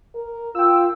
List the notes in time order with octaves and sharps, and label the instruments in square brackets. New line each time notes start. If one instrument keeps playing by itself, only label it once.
[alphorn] A#4
[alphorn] F4 [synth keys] G5 E6